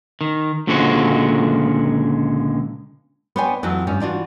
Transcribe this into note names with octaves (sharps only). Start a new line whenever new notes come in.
D#3
C#2 A#2 D3 F3 G#3 F#4
B3 D4 C5 C#5 G5 G#5
F2 E3 F#3 C4
G2 F3 C#4
E3 D4 F4 F#4